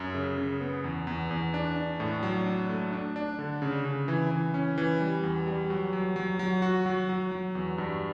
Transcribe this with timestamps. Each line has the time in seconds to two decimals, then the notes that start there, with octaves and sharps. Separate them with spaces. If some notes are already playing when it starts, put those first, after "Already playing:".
Already playing: F#2
0.14 C#3
0.38 C#3
0.61 B3
0.84 E2
1.07 E2
1.31 E2
1.54 D4
1.76 D4
2.00 A2
2.23 F#3
2.46 D4
2.69 A3
2.92 D4
3.16 D4
3.39 D3
3.62 C#3
3.85 C#3
4.08 E3
4.31 E3
4.54 C#4
4.78 E3
5.01 G3
5.23 E2
5.47 G3
5.70 F#3
5.93 F#3
6.16 F#3
6.39 F#3
6.62 F#4
6.86 F#3
7.09 F#3
7.31 F#3
7.55 E2
7.78 G2